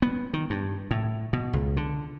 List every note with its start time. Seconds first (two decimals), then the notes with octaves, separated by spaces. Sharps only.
0.02 B3
0.33 D#3
0.50 G2
0.91 A2
1.33 B2
1.53 C#2
1.77 D3